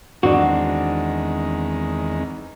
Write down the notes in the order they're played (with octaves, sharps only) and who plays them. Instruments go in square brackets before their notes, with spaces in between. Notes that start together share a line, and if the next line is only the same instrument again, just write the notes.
[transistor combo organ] E2 D#3 G#3 [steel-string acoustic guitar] C4 D4 [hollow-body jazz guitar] F#4